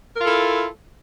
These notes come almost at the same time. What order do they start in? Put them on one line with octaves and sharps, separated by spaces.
A#4 F4 A4 E4